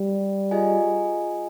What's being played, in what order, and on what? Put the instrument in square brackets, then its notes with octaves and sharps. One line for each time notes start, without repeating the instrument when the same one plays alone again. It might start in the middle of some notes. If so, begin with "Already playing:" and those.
Already playing: [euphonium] G3
[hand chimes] F4 G#4 D#5 G#5